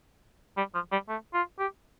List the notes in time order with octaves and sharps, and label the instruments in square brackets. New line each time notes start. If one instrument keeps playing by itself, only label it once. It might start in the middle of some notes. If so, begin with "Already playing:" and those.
[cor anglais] G3
F3
G3
A3
F4
G4